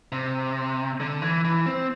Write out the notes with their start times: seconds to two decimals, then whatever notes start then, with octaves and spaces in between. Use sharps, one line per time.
0.12 C3
1.00 D3
1.22 E3
1.44 E3
1.66 C4